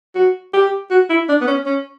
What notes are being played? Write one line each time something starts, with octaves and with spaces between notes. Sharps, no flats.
F#4
G4
F#4
E4
D4
B3
C#4
C#4